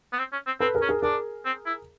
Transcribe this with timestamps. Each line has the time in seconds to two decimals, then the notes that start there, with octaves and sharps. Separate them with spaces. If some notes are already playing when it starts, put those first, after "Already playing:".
0.12 B3
0.18 C4
0.32 C#4
0.47 C4
0.60 C4 A4 B4
0.75 G#4 A#4
0.82 C#4
0.89 G#4 A#4
1.03 D4 G#4 A#4
1.45 C4
1.66 E4